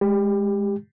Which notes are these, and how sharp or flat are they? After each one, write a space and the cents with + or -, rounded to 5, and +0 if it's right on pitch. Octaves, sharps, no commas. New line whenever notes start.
G#3 +0 G4 +15